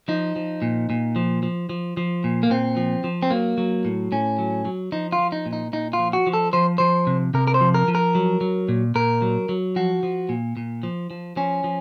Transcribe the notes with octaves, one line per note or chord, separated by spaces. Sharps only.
F3 D#4
F3
A#2
A#2
F3
F3
F3
F3
A#2
A#3
A#2 C4
F3
F3
C4
F#3 A#3
F#3
A2
A2 C#4
F#3
F#3
F3 D#4
F4
F3
D#4
A#2
D#4
A#2 D#4
F4
F3
F#4
F3
A4
F3 C5
F3 C5
C3
C3 A#4
A#4
C5
F3
A#4
F3
A#4
F#3
F#3
A#2
A#2 A#4
F#3
F#3
F3 F#4
F3
A#2
A#2
F3
F3
F3 C#4
F3